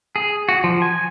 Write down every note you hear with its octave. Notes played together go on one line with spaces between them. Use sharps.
G#4
F#4
F3
G#5